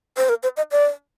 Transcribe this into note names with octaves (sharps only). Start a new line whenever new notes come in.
C5
A#4
C5
D#5
D5